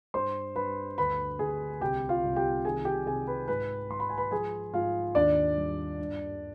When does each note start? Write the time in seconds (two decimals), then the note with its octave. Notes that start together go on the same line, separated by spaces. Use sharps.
0.14 G2 C5 C6
0.55 G2 B4 B5
0.98 D2 B4 B5
1.39 D2 G#4 G#5
1.81 C2 G4 G5
2.09 F4 F5
2.23 C2
2.36 G4 G5
2.65 D#3 G#4 G#5
2.85 G4 G5
3.06 C3 G#4 G#5
3.27 B4 B5
3.48 G#2 B4 B5
3.90 G#2 C6
4.00 B5
4.09 G#5
4.18 B4 B5
4.31 F3 G#4 G#5
4.74 G#2 F4 F5
5.15 D#2 D4 D5
5.56 G3
5.99 G2